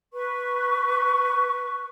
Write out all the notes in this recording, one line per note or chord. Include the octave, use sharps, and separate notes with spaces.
B4 C#6